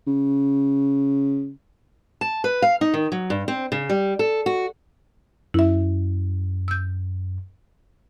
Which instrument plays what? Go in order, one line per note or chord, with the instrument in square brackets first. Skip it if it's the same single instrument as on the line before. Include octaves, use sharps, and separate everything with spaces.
[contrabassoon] C#3
[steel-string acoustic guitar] A5
B4
F5
D#4
D#3
F#3
G2
C4
C#3
G3
A4
F#4
[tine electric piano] F#2 [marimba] E4 E5
[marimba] E6 G6